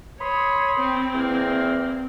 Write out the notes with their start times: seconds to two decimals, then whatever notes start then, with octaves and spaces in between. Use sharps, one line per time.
0.21 C#5 B5 C6 D#6
0.80 C4
1.14 E2 A#3